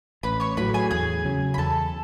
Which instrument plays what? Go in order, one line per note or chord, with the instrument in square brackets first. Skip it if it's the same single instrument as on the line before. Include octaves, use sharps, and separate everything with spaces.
[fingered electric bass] A1 [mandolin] B4 B5
[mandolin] C#5 C#6
[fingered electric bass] A2 F#3 [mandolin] B4 B5
[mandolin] G#4 G#5
[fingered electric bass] E2 [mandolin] G#4 G#5
[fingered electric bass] C#3 F#3 C#4
[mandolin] B5
[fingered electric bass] E2 [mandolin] A4 A5